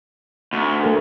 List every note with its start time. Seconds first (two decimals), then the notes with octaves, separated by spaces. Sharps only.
0.53 D2
0.83 A3 A4 A#4